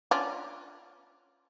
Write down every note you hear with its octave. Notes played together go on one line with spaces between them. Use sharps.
C#4 D4 F4